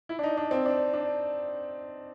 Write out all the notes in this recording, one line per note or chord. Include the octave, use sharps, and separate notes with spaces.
E4
D4
D#4
D4
C4
D4
D4